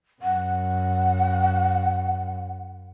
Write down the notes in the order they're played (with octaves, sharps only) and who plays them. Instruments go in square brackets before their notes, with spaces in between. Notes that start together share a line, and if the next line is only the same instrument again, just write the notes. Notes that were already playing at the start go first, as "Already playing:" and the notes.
[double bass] F#2 [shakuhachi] F#5